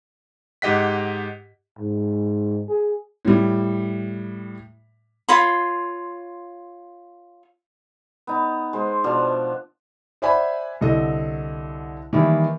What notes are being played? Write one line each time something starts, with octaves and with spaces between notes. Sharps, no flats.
G#2 G4 D#5 F#5 B6
G#2
G#4
A2 G3
F4 C#5 B5 C6
B3 D#4
G#3 C5
B2 F3 D4
C5 D5 E5 F#5 G#5 B5
C2 D3 A4 D#5
D#3 E3 G3 A#3 E4